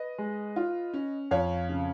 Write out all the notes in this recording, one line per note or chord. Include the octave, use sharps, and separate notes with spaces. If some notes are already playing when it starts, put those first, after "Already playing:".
Already playing: B4 D#5
G#3
F4
C#4
F2 C#5 F5
C#3